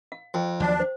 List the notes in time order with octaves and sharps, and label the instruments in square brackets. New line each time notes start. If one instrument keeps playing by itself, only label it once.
[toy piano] F5
[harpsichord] F2 [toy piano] G5
[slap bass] D#2 F3 F#3 [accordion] D4
[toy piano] C5